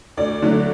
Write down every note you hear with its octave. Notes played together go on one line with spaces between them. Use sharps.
D2 D5
D3 F#3 A3